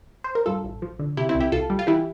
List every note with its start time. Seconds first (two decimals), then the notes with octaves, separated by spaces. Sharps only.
0.24 C5
0.35 A#4
0.46 G2 F4 A4
0.64 A1
0.82 F3
0.99 D3
1.17 C3 E4 G4
1.29 C4 E4
1.35 C2
1.40 E4 G4
1.52 C2 F4 A4
1.70 G3
1.79 F4
1.87 E3 E4 G4